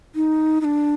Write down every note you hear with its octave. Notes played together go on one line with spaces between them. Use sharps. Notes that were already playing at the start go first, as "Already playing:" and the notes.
D#4
D#4
D4